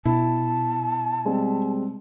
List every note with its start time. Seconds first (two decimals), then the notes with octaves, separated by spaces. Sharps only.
0.05 B2 E4 A5
1.25 G3 G#3 C4